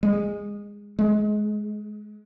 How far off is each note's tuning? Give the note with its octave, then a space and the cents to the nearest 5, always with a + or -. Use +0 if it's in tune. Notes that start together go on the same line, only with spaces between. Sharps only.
G#3 -20
G#3 +20